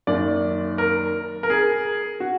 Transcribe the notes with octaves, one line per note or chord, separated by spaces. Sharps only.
F#2 D#3 A#3 D5
A#4
A#4
G#4
F#4